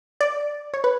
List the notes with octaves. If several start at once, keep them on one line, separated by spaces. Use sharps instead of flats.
D5
C#5
B4